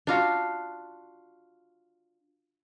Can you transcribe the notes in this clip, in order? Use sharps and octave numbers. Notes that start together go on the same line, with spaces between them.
D4 F4 F#4